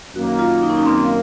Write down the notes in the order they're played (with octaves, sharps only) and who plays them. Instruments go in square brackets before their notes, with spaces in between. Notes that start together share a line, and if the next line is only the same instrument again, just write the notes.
[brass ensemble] F#2 D#3 A#3 [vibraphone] F#4
[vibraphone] F4
D#4
C#4
D#4
C4